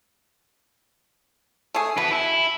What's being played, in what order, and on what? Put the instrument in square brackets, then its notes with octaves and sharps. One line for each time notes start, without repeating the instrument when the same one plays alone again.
[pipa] A3 G#4
[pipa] B2 [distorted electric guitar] E4 B4
[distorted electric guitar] E4